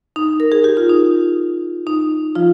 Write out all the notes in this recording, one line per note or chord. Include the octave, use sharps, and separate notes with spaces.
D#4
A#4
G#4
G4
F4
D#4
D#4
F3 F4